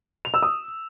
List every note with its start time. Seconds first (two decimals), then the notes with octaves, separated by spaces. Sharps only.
0.25 F7
0.34 E6
0.42 D#6